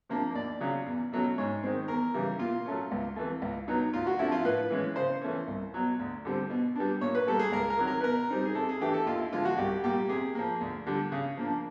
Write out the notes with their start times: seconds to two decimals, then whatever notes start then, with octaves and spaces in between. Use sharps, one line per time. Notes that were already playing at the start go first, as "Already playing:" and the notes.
0.09 C3 F3 A#3 D4
0.34 D#2 D5
0.60 C#3 F#3
0.86 E2
1.12 B2 F#3 A3 C#4
1.38 G#2 C#5
1.63 D#3 G#3 C4
1.88 E2 A#4
2.14 C#3 E3 G3
2.39 A#2 F4
2.66 F#3 A3 C#4
2.91 C#2
3.16 C3 E3 A3
3.42 C#2
3.68 B2 F#3 B3 D#4
3.93 D2 F4
4.07 F#4
4.19 C3 F3 A3 D4 E4
4.32 F4
4.45 A2 B4
4.70 E3 G#3 C#4
4.96 C#3 C5
5.21 E3 A3 C#4
5.48 C2
5.74 B2 F#3
6.00 D2
6.25 D3 G3 C4
6.50 B2
6.75 G3 B3 D4
7.01 A#2 C#5
7.15 B4
7.27 G3 A#3 A4
7.39 G#4
7.52 C#2 A#4
7.70 A#4
7.78 C3 D#3 F#3
7.87 A#4
8.01 B4
8.04 B2 A#4
8.30 G3 C4 D#4
8.45 G#4
8.55 C3 A4
8.69 G#4
8.80 E3 A3 D4 G4
8.94 A4
9.07 D#2 F4
9.19 E4
9.32 D3 F3 G#3 F4
9.45 F#4
9.58 C2 G4
9.84 A#2 G3 A#3 G4
10.09 C3 G#4
10.35 F3 A#3
10.61 D2
10.86 D3 G3
11.12 C#3
11.37 F3 A#3 D4